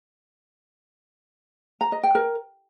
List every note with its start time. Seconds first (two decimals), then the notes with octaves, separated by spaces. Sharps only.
1.81 A#5
1.92 D#5
2.03 G5
2.15 A#4